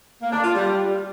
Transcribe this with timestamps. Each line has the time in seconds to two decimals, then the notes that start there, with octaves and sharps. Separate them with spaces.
0.22 A#3
0.33 D4
0.44 F4
0.55 G3